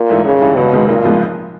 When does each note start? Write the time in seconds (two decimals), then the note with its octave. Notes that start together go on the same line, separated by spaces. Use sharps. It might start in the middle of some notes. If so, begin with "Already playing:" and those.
Already playing: A#2
0.09 G#2 E3 A3
0.25 G#1 C#3
0.41 G2 E3 G3
0.56 C#2 B2
0.72 C3 D#3 G#3 C4
0.88 B1 A#2
1.04 A2 F3 G#3 B3